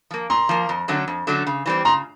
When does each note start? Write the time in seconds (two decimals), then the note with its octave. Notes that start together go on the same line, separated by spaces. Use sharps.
0.11 F3 A#3
0.30 A#2 A#5 C6
0.49 F3 A#3
0.69 F2
0.88 D3 F#3 A3 C#4
1.08 F2
1.27 D3 F#3 A3 C#4
1.47 C#3
1.66 E3 G3 C4
1.85 C#3 A#5 C6